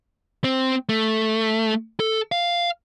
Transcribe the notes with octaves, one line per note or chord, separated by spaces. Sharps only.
C4
A3
A4
F5